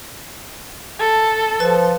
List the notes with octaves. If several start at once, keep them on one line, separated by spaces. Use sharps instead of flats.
A4
F3 B4